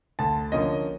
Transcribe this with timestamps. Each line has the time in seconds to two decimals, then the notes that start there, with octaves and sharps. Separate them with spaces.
0.19 D2 A5
0.52 D3 F3 A#3 C#4 D#5